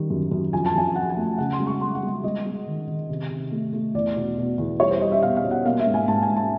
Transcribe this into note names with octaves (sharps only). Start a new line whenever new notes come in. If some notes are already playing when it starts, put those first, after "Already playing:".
Already playing: D#3 G3
F#2
F#2
F2 G#5
A5
F2 G#5
F3 F#5
G#5
A3
C#3 F#5
C6
G#3
C#6
G#3 C6
F#5
G#3
G#3 D#5
G#3
D#3
D#3
C3
C3
A3
A3
E2 D5
B2
B2
E2
G3 C#5
C5
G3 D#5
E5
B2 F5
F5
B2
F#5
A#3 F5
E5
G#2
G#5
G#2 A5
G#5
G#2
A5